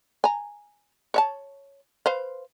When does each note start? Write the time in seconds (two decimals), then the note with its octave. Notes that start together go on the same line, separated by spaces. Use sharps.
0.24 G#5 A#5
1.14 C#5 E5 A5
2.06 B4 C5 F5